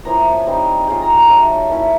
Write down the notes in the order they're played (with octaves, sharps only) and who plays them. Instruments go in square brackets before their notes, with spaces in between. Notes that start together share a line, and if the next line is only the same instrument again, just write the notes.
[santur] F3 A#3 C#4 E4 A#5
A5
G#5
G3 C4 D#4
G#3 C#4 F4 G5
A#5
A#5
F#3 A3 C#4 F4 A5
A#3 C#4 E4